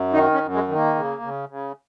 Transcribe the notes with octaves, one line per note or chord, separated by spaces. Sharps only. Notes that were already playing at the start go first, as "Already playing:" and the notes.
Already playing: F#2
D#3 D#4
C#4
F#2
G#3
D#3
A#3
C#3
C#3
C#3